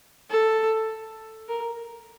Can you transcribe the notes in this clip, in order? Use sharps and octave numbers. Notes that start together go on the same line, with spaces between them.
A4
A#4